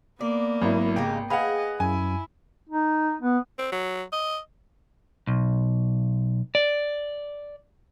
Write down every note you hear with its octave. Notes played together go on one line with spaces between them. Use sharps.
A#3 B3 D5
G#1 F#3 E4
C#3 D#4 G4 G5
G#4 B4 D#5 F5 F#5
F#2 E4 G#5
D#4
B3
C4
F#3
D#5
B1
D5